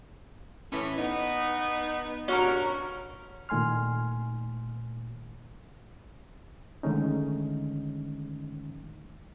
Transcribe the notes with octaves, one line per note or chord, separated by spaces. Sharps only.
A2 E3 C#4
B3 D#4
G2 A#2 C#4 F#4 A#4
A#2 D#3 A3 G#5 C6 F6
D3 D#3 G#3 A3 C#4 D#4